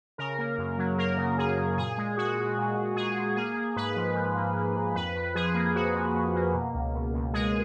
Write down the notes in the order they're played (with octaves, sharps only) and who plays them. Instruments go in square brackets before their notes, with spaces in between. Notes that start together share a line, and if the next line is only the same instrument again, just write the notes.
[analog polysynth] C#3 A#4
A#3
F#2
F#3
A#3 A#4
C#3
F#2 G#4
C#3
A#2 G#4
G#3
G#3 F#4
G#3
A#2
A#2
A#2 G#4
A#2
A#3 G#4
A#3
G#2 B4
F3
F3
A#3
A#3
G#2
F2 B4
F2
F3 G#4
A#3
F2 F#4
F3
F2
A#3
B2
C#2
B2
C#2
G#3 G#4